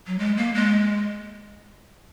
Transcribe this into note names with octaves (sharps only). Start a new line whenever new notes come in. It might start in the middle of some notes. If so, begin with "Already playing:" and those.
F#3
G#3
A#3
G#3